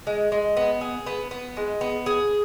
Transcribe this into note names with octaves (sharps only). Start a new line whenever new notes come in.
G#3
G#3
B3
G#4
B3
B3
G#3
B3
G#4